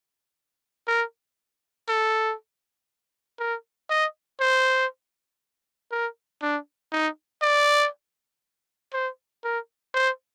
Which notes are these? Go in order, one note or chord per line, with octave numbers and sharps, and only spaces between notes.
A#4
A4
A#4
D#5
C5
A#4
D4
D#4
D5
C5
A#4
C5